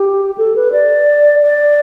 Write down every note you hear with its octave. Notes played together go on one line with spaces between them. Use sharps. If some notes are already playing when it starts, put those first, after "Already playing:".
Already playing: G4
A4
B4
D5
D5